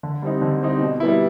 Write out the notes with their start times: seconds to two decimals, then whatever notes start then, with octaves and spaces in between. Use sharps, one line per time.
0.03 D3
0.22 G3 C4 D#4
0.42 D3
0.61 G3 C4 D#4
0.81 B2
1.00 G3 B3 E4